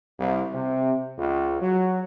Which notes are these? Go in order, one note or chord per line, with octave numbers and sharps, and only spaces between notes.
C2
C3
C#2
F#3